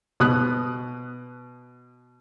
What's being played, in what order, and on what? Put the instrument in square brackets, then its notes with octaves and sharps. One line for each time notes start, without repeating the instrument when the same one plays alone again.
[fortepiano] B2 D#6 F#6